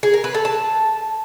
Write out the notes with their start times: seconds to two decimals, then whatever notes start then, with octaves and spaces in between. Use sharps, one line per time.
0.03 G#4
0.13 A#4
0.24 B4
0.34 A4
0.45 A5